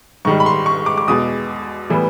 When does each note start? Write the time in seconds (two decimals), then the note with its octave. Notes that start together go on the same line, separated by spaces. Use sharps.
0.25 G#2 D#3 G3 C#6
0.40 B5
0.46 C6
0.66 C#6
0.86 D6
0.98 D6
1.08 E2 B2 G#3 D#6
1.90 A2 E3 G3 B3